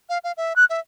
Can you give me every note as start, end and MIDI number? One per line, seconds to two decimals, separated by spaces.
0.09 0.18 77
0.24 0.32 77
0.37 0.53 76
0.56 0.65 90
0.70 0.80 76